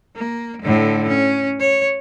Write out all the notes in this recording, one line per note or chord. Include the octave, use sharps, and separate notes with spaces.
A#3
A2 D3
C#4
C#5